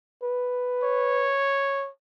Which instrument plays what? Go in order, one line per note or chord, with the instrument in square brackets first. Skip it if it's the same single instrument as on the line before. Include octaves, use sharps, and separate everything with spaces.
[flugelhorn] B4
[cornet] C#5